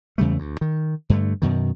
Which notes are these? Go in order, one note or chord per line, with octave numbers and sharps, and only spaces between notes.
E2 C#3 G3 A3
D2
D#3
G2 D3 A3
F#2 B2 D#3